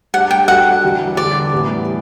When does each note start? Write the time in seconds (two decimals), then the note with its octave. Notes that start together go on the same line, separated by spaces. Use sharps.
0.14 G3 D4 G4 F#5
0.31 G5
0.48 G3 D4 F#4 A4 F#5
0.83 E3 G3 D4 F#4
1.17 D3 G3 D4 D5
1.53 A2 E3 G3 B3